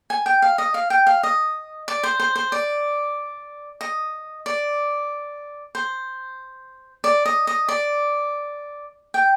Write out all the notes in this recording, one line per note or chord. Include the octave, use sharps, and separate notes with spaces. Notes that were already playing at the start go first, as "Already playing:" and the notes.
G#5
G5
F5
D#5
F5
G5
F5
D#5
D5
C5
C5
C5
D5
D#5
D5
C5
D5
D#5
D#5
D5
G5